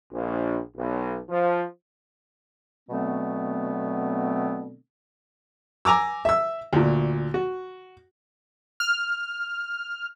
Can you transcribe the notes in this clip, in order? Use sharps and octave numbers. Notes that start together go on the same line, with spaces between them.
A#1
B1
F3
B2 D3 F#3 A3 B3 C4
G#5 A#5 D6 E6
E5 E6
D2 A#2
F#4
F6